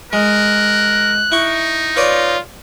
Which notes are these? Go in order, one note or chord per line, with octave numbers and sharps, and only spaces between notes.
G#3 A#4 F#6
D#4 E4 C#6
F4 B4 C#5 D5